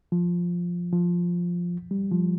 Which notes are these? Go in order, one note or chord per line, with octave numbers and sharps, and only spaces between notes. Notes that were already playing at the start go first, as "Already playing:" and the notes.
F3
F3
G3
F3